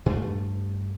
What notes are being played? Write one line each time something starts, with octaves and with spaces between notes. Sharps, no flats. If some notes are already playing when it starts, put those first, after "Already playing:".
G2 A3